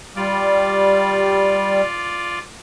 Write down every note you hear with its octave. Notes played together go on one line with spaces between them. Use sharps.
G3 F4 D5